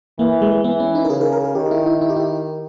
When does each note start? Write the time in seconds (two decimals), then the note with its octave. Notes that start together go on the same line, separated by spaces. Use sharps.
0.19 E3 A#3
0.42 G#3
0.64 E3 B3
0.80 C#4
0.95 D#4
1.05 A#4
1.10 C#3 G#4
1.21 A#4
1.33 A#4
1.44 G#4
1.55 D#3 G4
1.71 E4
1.86 E4
2.01 E4
2.10 G4
2.17 E4